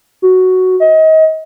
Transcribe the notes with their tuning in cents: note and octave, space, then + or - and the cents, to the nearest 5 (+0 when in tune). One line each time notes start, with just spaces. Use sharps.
F#4 +5
D#5 +30